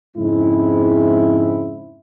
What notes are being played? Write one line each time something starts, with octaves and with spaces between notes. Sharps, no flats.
F2 G#2 C#3 G#3 C4 E4